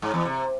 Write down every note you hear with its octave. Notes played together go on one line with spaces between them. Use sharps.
G#2
E2
C3